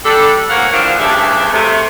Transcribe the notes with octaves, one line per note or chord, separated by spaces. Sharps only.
G3 D4 A4
G#2 A#3 C#5 F5 F#5
A2 E3 F3 A#3 C4 D4
D2 G2 C#3 D4 G4 E5
C3 A3